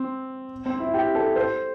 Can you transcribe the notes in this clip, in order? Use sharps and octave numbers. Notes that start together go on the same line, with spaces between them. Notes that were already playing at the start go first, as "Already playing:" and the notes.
Already playing: C4
C4
E4
G4
A4
C5